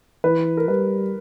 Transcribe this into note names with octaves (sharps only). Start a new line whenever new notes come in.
E3 B4
A#4
G3 B4